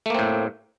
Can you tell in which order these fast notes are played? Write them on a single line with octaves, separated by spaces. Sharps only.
A3 A#3 C4 A2